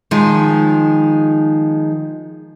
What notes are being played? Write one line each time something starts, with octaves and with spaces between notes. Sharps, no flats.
D#3 F3 G#3